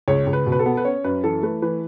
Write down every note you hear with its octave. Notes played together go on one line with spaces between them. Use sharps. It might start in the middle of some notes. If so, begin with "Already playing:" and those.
C#2 C#5
C#2
B4
B2
B4
A4
B3
B4
C#4 C#5
F#2 B4
E3 A4
A3 B4
E3 B4